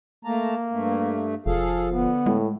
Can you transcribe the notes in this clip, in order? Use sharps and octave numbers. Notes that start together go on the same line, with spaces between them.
A3 A#3 A5 A#5
G2 A3
F1 F3 G#4 A4 F5
D3 B3
A2 G#3